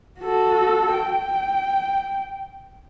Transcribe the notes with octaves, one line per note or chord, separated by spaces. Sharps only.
F#4 A4
G5